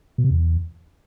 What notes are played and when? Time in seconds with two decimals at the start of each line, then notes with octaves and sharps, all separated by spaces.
0.18 B2
0.24 C3
0.30 E2